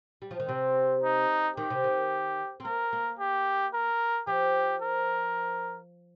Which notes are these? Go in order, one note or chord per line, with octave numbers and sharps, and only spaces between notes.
G3
F3
D#3
C3 C4
D#4
D#3 G4
C3
D#3
C4
A#3 A#4
A#3
G4
A#4
F3 G4
A#4